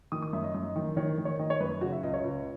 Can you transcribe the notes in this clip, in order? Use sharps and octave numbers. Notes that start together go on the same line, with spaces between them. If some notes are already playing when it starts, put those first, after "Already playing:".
D#3 D#6
D#6
F#2 E5
D#5
F#2 D#5
D#3
D#3 C#5
D#3
C#5
D#3 D#5
C#5
F#2 B4
C#3 F#4
E5
C#2 D#5
C#5
C#2